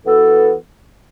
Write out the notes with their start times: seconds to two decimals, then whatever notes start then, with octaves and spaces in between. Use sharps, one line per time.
0.04 E3 B3 F#4 A4